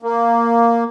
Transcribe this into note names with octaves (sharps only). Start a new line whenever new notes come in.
A#3